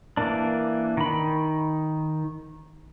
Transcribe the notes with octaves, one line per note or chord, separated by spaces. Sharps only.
E3 A#3 D4
D#3 B5